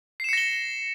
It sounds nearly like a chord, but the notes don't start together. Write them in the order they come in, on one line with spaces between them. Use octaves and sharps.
C7 E7 C#7 A#6 G7